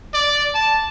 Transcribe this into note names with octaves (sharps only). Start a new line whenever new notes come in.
D5
A5